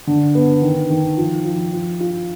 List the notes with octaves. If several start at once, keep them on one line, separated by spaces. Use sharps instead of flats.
D3
B3
D#3
D#3
F3
F3
F3
F4